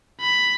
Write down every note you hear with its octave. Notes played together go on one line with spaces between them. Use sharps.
B5